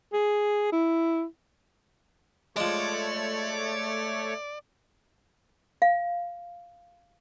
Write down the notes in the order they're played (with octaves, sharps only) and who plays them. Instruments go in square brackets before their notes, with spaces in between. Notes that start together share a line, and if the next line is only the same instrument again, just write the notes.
[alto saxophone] G#4
E4
[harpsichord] F3 G#3 [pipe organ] A3 C#5 [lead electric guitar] D5
[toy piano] F5